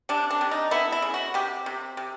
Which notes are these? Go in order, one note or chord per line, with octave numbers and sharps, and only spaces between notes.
C3 D4
D4
C3
D#4
B3 E4
E4
C#3
F#4
C3 G4
C3
C3